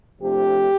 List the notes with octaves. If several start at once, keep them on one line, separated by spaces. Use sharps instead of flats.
C3 F3 A3 D4 G4